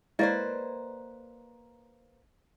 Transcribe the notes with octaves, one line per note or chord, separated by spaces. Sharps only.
G#3 A#3 E4 B4 C5 D5 D#5